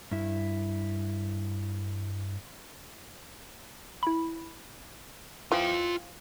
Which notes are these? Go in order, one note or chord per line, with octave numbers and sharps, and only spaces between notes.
G2 E4
E4 B5
E3 F3 F4 G5